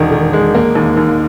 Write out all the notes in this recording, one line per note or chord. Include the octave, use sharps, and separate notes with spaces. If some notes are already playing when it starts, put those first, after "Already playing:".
Already playing: E1 D#3
D#3
G#3
A#3
D#2
D#2